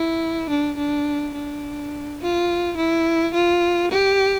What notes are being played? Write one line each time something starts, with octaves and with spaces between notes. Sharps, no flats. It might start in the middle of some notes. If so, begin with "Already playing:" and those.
Already playing: E4
D4
D4
D4
F4
E4
F4
G4